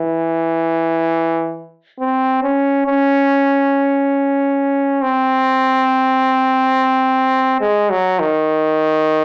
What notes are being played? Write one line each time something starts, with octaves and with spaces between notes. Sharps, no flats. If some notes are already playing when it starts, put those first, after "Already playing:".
Already playing: E3
C4
C#4
C#4
C4
G#3
F#3
D#3